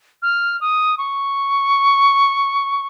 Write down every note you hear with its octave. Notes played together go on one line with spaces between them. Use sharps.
F6
D#6
C#6